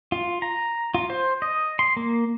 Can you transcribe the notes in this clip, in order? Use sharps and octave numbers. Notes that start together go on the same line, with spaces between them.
F4
A#5
F4
C5
D#5
C6
A#3